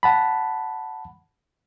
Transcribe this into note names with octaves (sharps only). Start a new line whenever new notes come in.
F#5 A5 B5